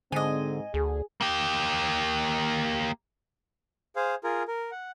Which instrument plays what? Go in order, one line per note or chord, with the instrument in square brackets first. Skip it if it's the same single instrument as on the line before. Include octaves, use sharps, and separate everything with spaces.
[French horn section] G#2 C4 [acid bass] D3 [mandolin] D#5 G#5
[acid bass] D2 [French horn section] G#4
[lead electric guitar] A#3 G4
[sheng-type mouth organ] G#4 C5 F5
F4 G#4 A#4
A#4
F#5